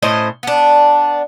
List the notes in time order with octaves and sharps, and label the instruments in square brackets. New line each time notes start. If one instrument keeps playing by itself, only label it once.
[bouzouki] A2 C#4 C5 D#5
B3 D4